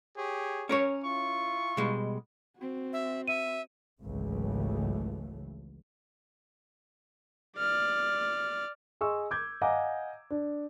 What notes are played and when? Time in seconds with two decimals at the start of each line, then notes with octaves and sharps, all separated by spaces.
0.17 G4 G#4 C#5
0.69 C#4 A#4 C#5
1.04 E4 F4 C#6
1.77 B2 G3 G#3
2.57 C4 F#4
2.93 E5
3.28 E5 D#7
4.02 G#1 C#2 C#3 E3 F#3 A3
7.59 D5 F6
9.01 G#4 D#5 C6 C#6 E6
9.31 D6 G6 G#6
9.62 D#5 F5 F#5 G#5 A#5 D6
10.30 D4